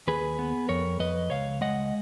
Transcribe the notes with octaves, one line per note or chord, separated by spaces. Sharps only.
D#2 G#4 B4
B3
F2 A#4 C#5
F2 B4 D#5
C#2 C#5 F5
G#3 D#5 F#5